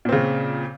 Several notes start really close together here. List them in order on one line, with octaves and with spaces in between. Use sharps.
A#2 C4 C#3